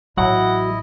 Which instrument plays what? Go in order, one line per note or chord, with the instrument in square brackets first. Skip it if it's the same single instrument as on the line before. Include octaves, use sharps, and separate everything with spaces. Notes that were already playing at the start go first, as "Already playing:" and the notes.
[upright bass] A1 [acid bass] F#3 [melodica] E4 D#5 [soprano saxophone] F#5